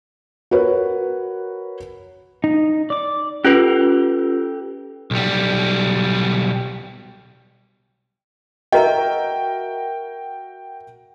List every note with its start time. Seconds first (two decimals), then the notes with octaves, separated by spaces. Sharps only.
0.51 F#4 A#4 B4 C#5
2.44 D#4
2.90 D5 D6
3.45 C#4 F4 G4 A4 B4
5.11 B1 G3
8.72 F#4 A#4 D#5 E5 G5 A#5